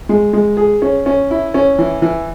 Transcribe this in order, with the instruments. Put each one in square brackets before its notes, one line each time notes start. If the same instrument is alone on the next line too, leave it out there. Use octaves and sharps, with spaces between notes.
[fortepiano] G#3
G#3
G#4
C#4
C#4
E4
C#4
E3
E3